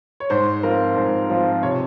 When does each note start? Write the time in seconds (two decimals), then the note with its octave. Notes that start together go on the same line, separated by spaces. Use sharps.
0.20 C#5
0.30 G#2 C5
0.63 F3 C4 F4 A#4
0.96 G#2 C5
1.30 F3 C4 F4
1.63 C3 C#5